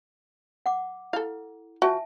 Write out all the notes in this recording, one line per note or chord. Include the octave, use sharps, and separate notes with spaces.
F#5 D6
E4 A4 F5
F3 F#4 E5 G#5 A5